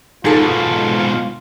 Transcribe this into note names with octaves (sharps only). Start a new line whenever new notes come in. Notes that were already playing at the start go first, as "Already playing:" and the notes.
G#2 B2 D#4 F4 G#4 A4